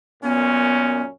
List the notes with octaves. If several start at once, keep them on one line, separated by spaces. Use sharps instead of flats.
F#2 A#2 B3 C#4